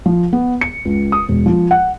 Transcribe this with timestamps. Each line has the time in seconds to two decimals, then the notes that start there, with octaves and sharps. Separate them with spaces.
0.06 F3
0.33 B3
0.61 C#7
0.85 C#2
1.12 D#6
1.29 E1
1.46 F3
1.71 F#5